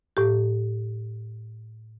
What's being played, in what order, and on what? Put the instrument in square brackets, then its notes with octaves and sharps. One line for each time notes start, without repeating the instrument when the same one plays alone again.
[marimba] A2 G4